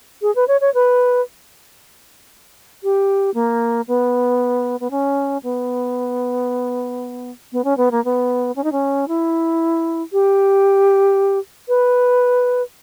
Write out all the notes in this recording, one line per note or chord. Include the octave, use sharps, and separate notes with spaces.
G#4
B4
C#5
C#5
B4
G4
A#3
B3
B3
C#4
B3
B3
C#4
B3
A#3
B3
C#4
D#4
C#4
E4
G4
B4